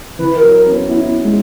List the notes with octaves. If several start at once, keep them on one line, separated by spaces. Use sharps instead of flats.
E3 B4
A#4
F#3
A#4
C#4
B3
B3 E4
D#4
E4
G#3 F#4